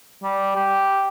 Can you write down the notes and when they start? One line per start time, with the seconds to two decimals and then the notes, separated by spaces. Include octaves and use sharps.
0.23 G3
0.55 G4